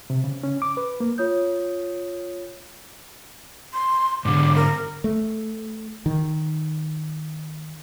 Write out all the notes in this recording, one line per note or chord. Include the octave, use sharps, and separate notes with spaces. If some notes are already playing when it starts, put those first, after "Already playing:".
C3
C#3
C#4
D6
B4
A#3
F4 C#5 D#6 G6
C6
G#2 D3 D6
A#4
A3
D#3